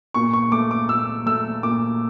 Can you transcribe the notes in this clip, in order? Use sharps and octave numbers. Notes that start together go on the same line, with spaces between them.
A#2 C#6
C#6
A3 D6
D6
A#2 E6
A3 E6
A#2 D6